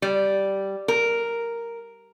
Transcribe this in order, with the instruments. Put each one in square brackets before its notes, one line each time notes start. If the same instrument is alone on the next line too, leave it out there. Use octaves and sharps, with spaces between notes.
[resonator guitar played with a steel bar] G3
A#4